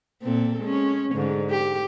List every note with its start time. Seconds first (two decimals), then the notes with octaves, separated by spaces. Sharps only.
0.23 A#2 C4 A4
0.61 G#3 C#4
1.13 G#2 D3
1.50 G4